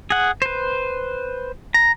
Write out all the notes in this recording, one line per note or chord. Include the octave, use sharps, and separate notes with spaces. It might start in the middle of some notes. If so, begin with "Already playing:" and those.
G#4 F#5
B4 C5
A#5